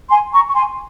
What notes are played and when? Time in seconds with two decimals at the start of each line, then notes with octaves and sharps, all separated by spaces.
0.10 G#5 C6
0.33 A#5 C#6
0.48 C#6
0.54 G#5 C6